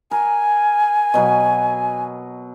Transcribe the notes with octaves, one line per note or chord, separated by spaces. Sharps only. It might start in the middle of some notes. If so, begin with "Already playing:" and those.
A#4 G#5
B2 F#3 B4